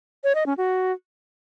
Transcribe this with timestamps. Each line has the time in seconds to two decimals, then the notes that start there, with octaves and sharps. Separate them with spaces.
0.24 C#5
0.35 D#5
0.46 C#4
0.58 F#4